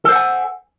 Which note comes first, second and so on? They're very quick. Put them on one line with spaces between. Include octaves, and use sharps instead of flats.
A4 C5 F#5 G#5